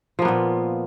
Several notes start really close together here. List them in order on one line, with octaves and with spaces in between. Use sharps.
F3 A#3 B3 A#2